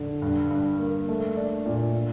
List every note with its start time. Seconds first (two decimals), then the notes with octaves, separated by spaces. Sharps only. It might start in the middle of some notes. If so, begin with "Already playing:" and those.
Already playing: D3
0.22 G2
0.51 G2
0.79 A#3
1.09 A3
1.37 D4
1.66 A#2
1.94 D4